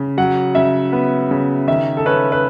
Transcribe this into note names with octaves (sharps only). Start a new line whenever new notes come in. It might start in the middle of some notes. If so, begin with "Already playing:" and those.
Already playing: C#3
F#3 F#5
C#3 E5
B3
C#3
D#3 E5
A4
C#4 B4
B4